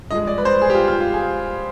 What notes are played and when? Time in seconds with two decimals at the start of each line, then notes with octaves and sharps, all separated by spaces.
0.11 G2 F3 G#3 D#5
0.27 D5
0.38 B4
0.45 C5
0.62 G#4
0.70 G4
0.75 F4
0.88 F4
1.00 F4
1.14 G#4